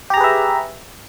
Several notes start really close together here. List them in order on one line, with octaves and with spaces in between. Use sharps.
G4 A#5 G#4 B4 E5